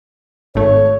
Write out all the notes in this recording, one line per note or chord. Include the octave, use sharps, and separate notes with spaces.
G#1 A3 C#5